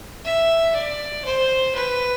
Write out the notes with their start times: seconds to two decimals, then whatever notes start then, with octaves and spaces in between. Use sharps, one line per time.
0.25 E5
0.75 D5
1.25 C5
1.75 B4